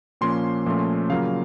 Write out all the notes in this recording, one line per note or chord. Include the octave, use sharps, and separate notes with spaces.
A#2 F3 A#3 C#4 C6
A#2 F3 A3 C#4
C#3 F#3 A#3 F4 F5